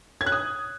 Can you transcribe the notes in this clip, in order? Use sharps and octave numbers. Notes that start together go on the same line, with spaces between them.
G#6
F#6
D#6